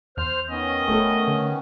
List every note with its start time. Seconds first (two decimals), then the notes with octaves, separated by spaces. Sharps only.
0.17 E2 C5 F6
0.50 D#3 B3 C#4 D#5
0.88 D1 A3 A4
1.27 D3